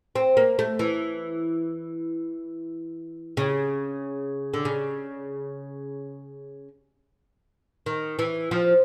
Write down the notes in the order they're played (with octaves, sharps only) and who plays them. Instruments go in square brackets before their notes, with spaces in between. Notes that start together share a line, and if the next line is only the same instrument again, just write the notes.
[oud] C4
A#3
A3
E3
C#3
D3
C#3
D#3
E3
F3